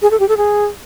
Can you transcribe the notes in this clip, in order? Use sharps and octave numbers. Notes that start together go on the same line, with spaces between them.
G#4
A4
G4
A4
G#4